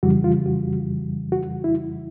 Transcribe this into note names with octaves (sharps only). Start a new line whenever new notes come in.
F2 C#3 E3 G3 F#4
F4
F#4
F#4
E4